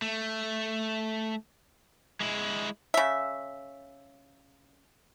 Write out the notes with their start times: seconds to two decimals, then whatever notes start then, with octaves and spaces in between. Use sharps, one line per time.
0.02 A3
2.20 G#3 E4
2.94 C#3 E5